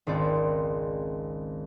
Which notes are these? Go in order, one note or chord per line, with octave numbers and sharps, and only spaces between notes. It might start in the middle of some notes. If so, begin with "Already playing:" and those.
G#1 C#2 C4 D5